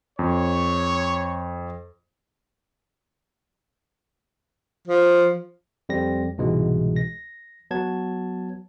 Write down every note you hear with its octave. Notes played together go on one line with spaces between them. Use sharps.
F2 C#5
F3
F2 G3 C4 A#6
C2 G#2 B2 E3 G#3
A#6
F#3 B3 A5 G#6